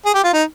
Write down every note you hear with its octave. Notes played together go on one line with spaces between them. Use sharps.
G#4
G4
F4
D#4